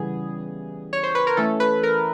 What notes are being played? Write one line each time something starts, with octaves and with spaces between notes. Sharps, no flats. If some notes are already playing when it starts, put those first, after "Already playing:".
Already playing: C#3 E3 G3 B3 G#4
C#5
C5
B4
A#4
E3 A3 C#4 A4
B4
A#4